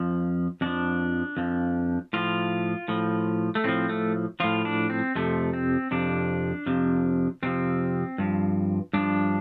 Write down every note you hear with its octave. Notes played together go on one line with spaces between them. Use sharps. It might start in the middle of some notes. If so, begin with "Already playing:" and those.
Already playing: F2 F3
F2 F3 D4
F2 F3
A2 F3 F4
A2 F3
A3
A2 F3 C4
A3
A2 F3 F4
D4
C4
F2 C3 F3 A3
C4
F2 C3 F3 D4
F2 C3 F3
F2 C3 F3 C4
G2 F3
G2 F3 D4